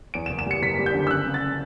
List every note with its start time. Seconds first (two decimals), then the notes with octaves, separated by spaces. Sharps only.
0.14 E2 D7
0.26 E7
0.30 F#1
0.39 E7
0.46 G3 C#7
0.62 F#1 B6
0.79 G3
0.86 G6
0.95 D3
1.07 E6
1.11 C#3 F#6
1.27 C#3
1.34 A6